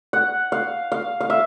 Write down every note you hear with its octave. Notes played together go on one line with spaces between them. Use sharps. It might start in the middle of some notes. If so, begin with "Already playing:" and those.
F#5
F5
F5
F5
E5